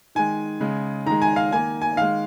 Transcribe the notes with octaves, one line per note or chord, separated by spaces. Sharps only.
D#3 G#3 G#5
C#3 G#3
D#3 G#3 A#5
G#5
F5
D#3 A#3 G#5
G#5
D#3 G#3 F5